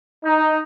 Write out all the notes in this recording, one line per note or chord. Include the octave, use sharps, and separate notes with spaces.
D#4